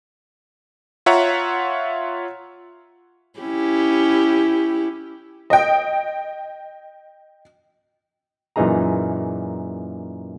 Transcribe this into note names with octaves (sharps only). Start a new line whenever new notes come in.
F4 C#5 E5 F#5 A#5
C#4 E4 G4
D#5 G5
F#2 A#2 E3 D#4 G#4 A#5